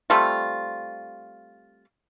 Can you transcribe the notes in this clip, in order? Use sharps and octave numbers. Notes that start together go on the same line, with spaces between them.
G3 A3 C4 F4